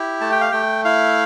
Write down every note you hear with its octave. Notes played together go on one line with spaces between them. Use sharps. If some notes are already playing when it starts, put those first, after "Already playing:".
Already playing: E4 G4
A3 A5
G5
F5
A3 G5
E4 F5